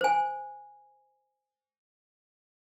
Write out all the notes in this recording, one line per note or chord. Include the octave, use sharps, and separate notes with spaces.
C5 G#5